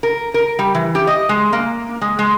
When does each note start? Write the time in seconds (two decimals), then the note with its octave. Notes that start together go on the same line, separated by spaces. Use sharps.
0.03 A#4
0.34 A#4
0.59 G3
0.75 E3
0.95 G4
1.07 D#5
1.29 G#3
1.53 A#3
2.01 G#3
2.19 G#3